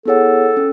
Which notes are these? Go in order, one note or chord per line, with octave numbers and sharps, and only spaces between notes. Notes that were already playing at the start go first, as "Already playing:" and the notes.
B3 E4 G#4 A4 C#5 F#5
C#4